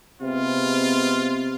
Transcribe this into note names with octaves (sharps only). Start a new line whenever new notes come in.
C3 G#3 B3 C4 F4